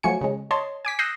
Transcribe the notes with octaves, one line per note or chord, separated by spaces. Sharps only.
F3 F#3 A3 G#5 C#7
C#3 G#3
C#5 D#5 A5 C6
G#5 D6 B6
D#6 E6 F#6 G6 A#6 C7